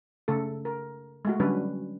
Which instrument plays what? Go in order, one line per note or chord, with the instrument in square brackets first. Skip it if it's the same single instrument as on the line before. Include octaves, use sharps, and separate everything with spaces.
[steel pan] C#3 A3 A4
A#4
G#3 A3 F#4
D3 F#3 G3 C#4 D4 B4